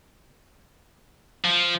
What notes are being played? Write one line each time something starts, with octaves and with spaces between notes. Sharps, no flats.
F3